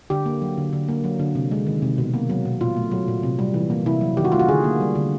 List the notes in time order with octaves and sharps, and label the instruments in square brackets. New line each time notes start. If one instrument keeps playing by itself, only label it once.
[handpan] D3 G4
A#3
F#3
D3
D3
A#3
F#3
D3
C3
G#3
D#3
C3
B2
A#3
F#3
B2
A#2 F4
A3
F#3
A#2
C3
G3
E3
A#3
C3 E4
F#3
D#3 G4
F#4
A3 F4
F#4
D3 G#4
A#3
G3
D3